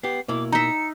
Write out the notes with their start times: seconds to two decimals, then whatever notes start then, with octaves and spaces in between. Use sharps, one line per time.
0.03 B3 G4 C7
0.28 B2 A#3 E4 D6
0.52 D#4 E5 A#5 C#7